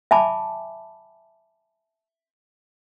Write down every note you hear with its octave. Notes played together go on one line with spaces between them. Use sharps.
E5 G#5 A5 B5 D6